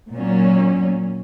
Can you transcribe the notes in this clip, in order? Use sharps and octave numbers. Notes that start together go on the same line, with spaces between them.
A#2 F#3 C#4